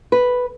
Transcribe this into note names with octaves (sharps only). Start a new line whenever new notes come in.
B4